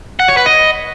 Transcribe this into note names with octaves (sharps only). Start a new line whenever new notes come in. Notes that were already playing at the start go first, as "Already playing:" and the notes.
F#5
C#5
B4
D#5